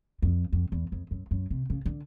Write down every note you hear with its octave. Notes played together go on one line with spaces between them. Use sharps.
F2
F2
E2
F2
F#2
F#2
C3
C#3
D3